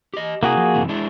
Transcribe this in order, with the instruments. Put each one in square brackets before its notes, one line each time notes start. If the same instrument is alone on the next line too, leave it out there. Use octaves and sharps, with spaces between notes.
[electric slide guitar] G4 D#5
[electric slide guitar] C3 E4 A#4 [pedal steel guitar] A#3 F#4 G#4
[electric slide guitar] F3
F#2 C3 E3
G#3 D4 E4